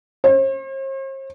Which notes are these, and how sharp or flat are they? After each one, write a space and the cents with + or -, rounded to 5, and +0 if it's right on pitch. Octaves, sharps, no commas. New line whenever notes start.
C5 +45